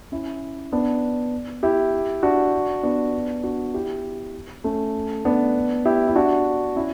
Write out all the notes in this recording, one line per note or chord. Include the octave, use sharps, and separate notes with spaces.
C#4 E4
B3 D4
E4 G4
D4 F#4
B3 D4
D4 F#4
E4 G4
A3 C#4
B3 D4
E4 G4
E4
D4 F#4
C#4 E4